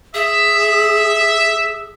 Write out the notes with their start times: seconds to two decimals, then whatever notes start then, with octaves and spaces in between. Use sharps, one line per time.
0.14 G#4 E5